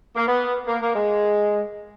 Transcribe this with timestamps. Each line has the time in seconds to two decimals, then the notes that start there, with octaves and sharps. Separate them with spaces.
0.16 A#3
0.26 B3
0.67 A#3
0.81 A#3
0.94 G#3